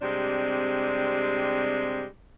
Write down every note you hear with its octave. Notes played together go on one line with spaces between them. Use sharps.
C3 G3 G#3 C4 D4